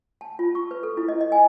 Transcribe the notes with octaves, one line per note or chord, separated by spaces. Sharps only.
A5
F4
C#6
B4
A4
E4
D#5
D#5
G#5